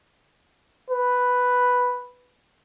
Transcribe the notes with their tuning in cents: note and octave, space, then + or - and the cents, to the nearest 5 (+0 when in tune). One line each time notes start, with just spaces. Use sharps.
B4 +0